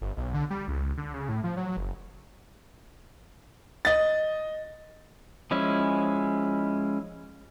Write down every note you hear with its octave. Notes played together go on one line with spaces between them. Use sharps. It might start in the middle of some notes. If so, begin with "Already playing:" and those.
G1
B1
D3
G3
C#2
D3
C#3
A2
F3
F#3
F#1
D#5 A6
F3 G#3 C#4 E4